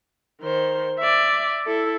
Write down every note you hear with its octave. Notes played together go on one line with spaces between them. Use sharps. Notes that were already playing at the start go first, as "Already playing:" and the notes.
D#3 C5
D5 E5
E4 A4